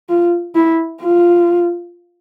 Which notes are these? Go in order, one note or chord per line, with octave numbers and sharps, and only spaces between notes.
F4
E4
F4